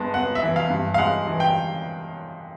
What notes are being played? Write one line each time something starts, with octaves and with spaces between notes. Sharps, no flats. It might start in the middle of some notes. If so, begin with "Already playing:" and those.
Already playing: G2 G#3 B3
B3 F#5
E5
E3
F5
G2
F5
G#3 F#5
E3
G5